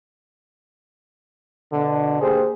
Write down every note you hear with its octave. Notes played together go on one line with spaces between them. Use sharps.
B2 D3
A#3 G4 G#4 C5